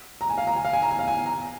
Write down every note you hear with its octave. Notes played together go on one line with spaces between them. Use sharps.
A#5
G#5
F5
A#5
G#5
F5
G#5
A#5
G#5
F5
G#5
A#5